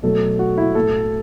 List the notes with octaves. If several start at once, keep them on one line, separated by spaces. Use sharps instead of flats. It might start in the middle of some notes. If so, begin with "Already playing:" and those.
B2 F#3 A3 A4
F#4
E4
A2 A3 A4